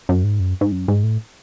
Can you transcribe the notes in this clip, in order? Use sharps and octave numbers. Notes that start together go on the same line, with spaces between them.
F#2
G#2
F#2
G#2
F#2
G#2
A2